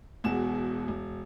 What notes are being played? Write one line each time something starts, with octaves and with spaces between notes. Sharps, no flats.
E1 E2 B2 F#4 E7
E1